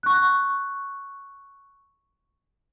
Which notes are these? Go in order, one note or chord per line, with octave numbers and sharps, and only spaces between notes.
C#6 F#6